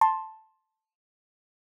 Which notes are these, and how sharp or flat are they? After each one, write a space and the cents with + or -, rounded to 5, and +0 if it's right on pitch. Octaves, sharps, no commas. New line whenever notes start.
A5 +0 C6 +15